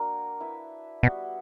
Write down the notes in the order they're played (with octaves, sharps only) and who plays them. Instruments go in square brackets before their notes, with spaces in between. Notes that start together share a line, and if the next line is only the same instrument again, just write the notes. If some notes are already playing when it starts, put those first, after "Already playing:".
Already playing: [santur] A#3 D4 F#4 A#4
E4 B4 E5
[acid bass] B2 [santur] G3 B3 F#4